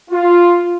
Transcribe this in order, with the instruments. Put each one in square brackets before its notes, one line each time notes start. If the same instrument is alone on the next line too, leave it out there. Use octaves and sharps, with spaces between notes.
[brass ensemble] F4